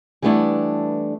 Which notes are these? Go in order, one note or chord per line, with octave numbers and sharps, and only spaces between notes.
E3 G3 A3 B3 D4 E4